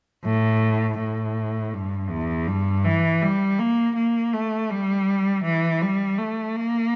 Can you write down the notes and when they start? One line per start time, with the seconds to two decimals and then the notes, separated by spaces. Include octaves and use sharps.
0.25 A2
0.99 A2
1.73 G2
2.10 E2
2.47 G2
2.84 E3
3.22 G3
3.59 A#3
3.95 A#3
4.33 A3
4.70 G3
5.44 E3
5.82 G3
6.18 A3
6.56 A#3